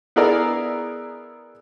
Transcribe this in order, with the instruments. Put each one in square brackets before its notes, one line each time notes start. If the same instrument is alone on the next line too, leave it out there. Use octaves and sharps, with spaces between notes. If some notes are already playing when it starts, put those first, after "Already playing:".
[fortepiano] B3 E4 G#4 A#4 D5